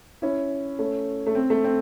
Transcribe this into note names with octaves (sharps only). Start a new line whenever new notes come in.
C#4 E4
A3 C#4
A3
C4
A3
C4